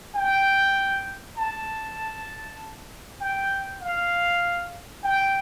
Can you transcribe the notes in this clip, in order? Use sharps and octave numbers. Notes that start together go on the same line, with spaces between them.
G5
A5
G5
F5
G5